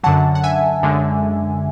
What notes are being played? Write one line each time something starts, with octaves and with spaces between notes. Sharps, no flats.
F#2 D3 F#3 F#5 A5
F#5
E5 G#5
F#2 D3 G#3